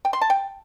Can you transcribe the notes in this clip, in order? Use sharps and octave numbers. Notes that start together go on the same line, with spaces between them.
G5
C6
A5
G5